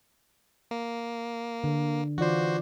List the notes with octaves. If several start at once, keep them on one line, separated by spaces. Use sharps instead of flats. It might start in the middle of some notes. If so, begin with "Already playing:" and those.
A#3
D3
E3 F4 F#4 C5 D5